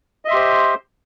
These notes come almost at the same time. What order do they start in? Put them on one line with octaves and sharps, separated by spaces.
D#5 E5 C6 G4 C5